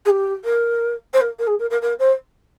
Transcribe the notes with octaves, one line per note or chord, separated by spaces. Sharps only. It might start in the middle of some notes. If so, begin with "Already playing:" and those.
G#4
G4
A#4
C5
A#4
A#4
G#4
A#4
A#4
A#4
C5